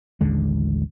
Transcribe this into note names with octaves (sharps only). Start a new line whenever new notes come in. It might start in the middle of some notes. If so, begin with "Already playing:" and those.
A1 D#2 D3 G#3